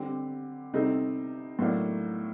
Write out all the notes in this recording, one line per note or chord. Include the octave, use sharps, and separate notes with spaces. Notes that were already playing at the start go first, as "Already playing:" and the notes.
Already playing: D3 G3 C4 G4
C3 G3 C4 D#4 A4
A2 F#3 A#3 D4